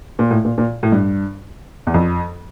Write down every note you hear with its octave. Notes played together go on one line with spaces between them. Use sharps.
A#2
A2
A#2
A#2
A2
G2
E2
F2